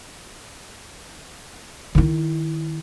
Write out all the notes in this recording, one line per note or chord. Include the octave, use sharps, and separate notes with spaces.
D#3 E4